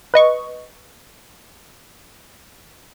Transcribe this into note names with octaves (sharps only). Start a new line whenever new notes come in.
B4 D#5 C#6